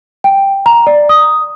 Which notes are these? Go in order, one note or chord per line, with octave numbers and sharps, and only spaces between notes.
G5
A#5
D5
D#6